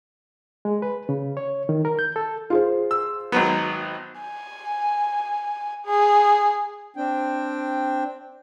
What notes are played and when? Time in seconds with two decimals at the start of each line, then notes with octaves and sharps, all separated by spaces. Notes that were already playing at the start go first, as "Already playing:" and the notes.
0.65 G#3
0.82 B4
1.09 C#3
1.37 C#5
1.69 D#3
1.85 A#4
1.99 G6
2.16 A4
2.50 F4 G#4 C5
2.91 E6
3.32 G#1 F#3 B3
4.20 G#5
5.85 G#4
6.96 C4 D4 G5